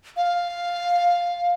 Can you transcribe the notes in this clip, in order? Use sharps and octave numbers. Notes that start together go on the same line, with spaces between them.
F5